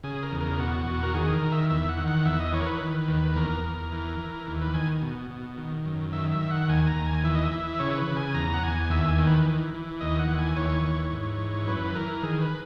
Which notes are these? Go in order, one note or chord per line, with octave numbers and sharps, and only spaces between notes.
C#3 G#4
A#4
E2
A#4
B2 F#4
E2
A#4
D#3 G#4
A#4
D#3
E5
E2 E5
F#5
D#3
F#5
E2 E5
D#5
E3 C#5
A#4
B4
D#3
D#2
E2 A#4
E2
E3
E3
D#2
B4
D#3 G#5
B2
B2
D#3
F#2
D#3 E5
E5
D#3
F#5
D#2 G#5
A#5
D#2
G#5
E3 E5
D#5
E5
E3
C#3 C#5
B4
C#3
G#5
E2 A#5
F#5
E2 G#5
D#2 E5
G#5
D#3
B4
E3
E3
D#2 D#5
F#5
E3
G#5
D#2 C#5
E3
G#2
E3
F#2 B4
E3 A#4
D#3 G#4
B4